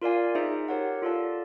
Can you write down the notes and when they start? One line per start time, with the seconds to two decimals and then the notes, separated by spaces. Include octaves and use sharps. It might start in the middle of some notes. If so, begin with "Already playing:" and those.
0.02 F4 A#4 D5 F5 G#5
0.35 D#4 G#4 C5 E5
0.68 G4 A#4 C#5 F#5
1.02 F4 A4 D5 F5 A5